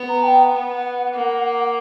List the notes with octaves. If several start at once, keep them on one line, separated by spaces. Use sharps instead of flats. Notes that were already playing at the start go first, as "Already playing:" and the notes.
Already playing: B3
A#5
G5
F#5
B3
A#3